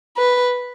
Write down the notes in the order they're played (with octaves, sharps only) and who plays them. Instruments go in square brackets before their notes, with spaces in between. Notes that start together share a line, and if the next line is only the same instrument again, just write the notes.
[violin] B4